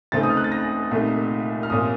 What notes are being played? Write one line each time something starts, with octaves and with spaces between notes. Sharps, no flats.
C#2 C#3 A3 C4 D#4 A6
D#6
F6
F#6
A6
A#6
C2 A#2 A3 D#4
F6
C2 A#2 F3 A#3 C#4 D#6